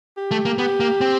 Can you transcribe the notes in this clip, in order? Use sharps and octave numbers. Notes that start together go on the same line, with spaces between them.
G4
A3
A#3
B3 G4
A#3
C4